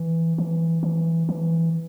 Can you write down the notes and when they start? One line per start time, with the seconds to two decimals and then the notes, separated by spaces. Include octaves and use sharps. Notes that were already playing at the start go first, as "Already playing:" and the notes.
Already playing: E3
0.38 E3
0.83 E3
1.29 E3